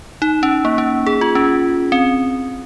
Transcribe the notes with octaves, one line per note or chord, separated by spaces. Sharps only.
D#4
C#4
A#3
C#4
G#4
F4
C#4
C4